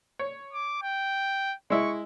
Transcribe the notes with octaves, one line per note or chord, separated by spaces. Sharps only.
C#5
D6
G5
G#3 E4 C#6